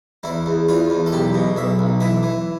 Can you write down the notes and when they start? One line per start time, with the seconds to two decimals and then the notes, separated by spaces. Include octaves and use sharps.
0.23 E2 E4
0.46 E2
0.69 E2 F4
0.90 E2
1.06 A4
1.12 B1 G4
1.35 B2
1.57 B1 E5
1.79 B1
2.00 E3 E5
2.23 E3